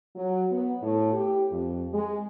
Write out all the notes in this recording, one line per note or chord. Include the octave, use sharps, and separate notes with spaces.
F#3
B3
A2
G4
F2
G#3